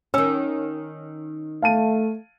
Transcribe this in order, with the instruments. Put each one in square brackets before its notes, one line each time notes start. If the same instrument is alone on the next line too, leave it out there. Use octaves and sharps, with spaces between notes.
[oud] D#3 C#4 [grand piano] E6
[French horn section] A3 [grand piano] F5 A5 D#7